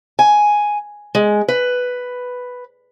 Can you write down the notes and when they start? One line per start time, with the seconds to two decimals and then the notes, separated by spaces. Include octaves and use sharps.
0.19 G#5
1.15 G#3
1.48 B4